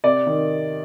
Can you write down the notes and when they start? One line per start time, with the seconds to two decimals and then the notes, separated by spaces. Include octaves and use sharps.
0.04 C3 D5
0.27 D#3